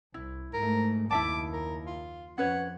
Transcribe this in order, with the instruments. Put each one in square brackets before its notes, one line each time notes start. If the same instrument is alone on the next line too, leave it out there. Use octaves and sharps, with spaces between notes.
[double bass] C2 [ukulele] E4
[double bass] G#2 A3 [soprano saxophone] A#4
[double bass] F#1 D#2 [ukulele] E4 E5 A5 [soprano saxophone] D6
[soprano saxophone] A#4
F4
[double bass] F2 [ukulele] C#4 B4 C#5 [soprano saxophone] F#5